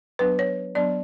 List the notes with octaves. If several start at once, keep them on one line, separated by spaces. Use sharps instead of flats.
F#3 B3 D4 B4
C#5
F#3 B3 D4 D5